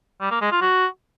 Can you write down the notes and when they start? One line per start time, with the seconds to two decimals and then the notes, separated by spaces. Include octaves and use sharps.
0.21 G3
0.31 A#3
0.41 G#3
0.51 F4
0.61 F#4